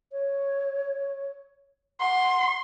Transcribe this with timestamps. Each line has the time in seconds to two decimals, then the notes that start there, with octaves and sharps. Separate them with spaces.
0.12 C#5
2.00 F#5 C6